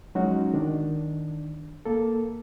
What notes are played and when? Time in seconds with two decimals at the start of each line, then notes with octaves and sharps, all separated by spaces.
0.15 F#3 G#3 C#4 D#4 F#4
0.54 D#3 D4
1.85 A#3 A4